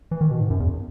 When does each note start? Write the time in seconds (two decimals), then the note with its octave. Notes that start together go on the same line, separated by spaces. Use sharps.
0.11 E3
0.21 D#3
0.31 B2
0.40 G#2
0.50 F#2
0.60 E2